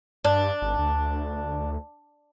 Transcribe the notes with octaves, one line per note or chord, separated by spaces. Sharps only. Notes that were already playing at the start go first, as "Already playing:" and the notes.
G2 D4
G#1
D2